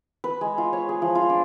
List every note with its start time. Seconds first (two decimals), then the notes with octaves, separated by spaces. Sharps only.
0.24 B4
0.41 G#3
0.58 F4
0.73 C#5
0.89 G#4
1.02 F3
1.15 F4
1.30 D4